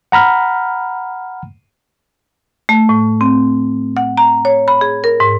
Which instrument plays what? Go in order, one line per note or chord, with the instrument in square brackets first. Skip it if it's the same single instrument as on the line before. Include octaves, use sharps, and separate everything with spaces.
[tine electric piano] F#5 A#5 B5 F6
[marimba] A3
A2
C4
F#5
A#5
C#5
B5
G#4
A#4
G#2